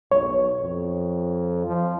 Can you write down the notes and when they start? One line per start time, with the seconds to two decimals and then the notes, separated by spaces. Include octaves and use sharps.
0.12 B1 C#5
0.61 F2
1.66 F3